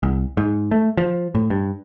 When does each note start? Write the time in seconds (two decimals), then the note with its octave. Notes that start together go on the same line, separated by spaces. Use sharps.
0.03 C2
0.37 G#2
0.71 A3
0.98 F3
1.35 A2
1.50 G2